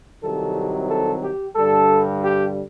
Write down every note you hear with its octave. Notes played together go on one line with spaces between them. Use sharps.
C2 C3 D#3 F#3 A4
A4
G4
G2 D3 G3 A4
G4